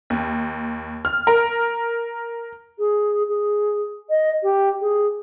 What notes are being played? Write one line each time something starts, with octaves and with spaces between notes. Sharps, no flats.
D#2
F6
A#4
G#4
G#4
D#5
G4
G#4